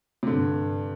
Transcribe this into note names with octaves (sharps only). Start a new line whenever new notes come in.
C3
G2 D3